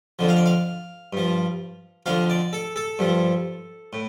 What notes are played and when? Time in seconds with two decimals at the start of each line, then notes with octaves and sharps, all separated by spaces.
0.19 F2 D3 F3
0.29 F5
0.36 D5
0.46 F5
1.13 G2 F3
2.06 F2 D3 F3 F5
2.30 D5
2.53 A4
2.76 A4
2.99 G2 F3
3.93 A2